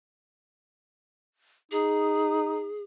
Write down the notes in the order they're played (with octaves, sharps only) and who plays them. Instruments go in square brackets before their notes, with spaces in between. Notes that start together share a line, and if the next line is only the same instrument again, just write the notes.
[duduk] D#4 [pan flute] G#4